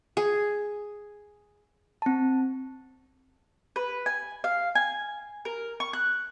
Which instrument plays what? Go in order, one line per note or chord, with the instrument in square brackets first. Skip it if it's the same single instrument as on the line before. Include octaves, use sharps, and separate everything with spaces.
[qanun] G#4
[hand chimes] C4 A5
[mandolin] B4
G#5
F5
G#5
A#4
C#6
F#6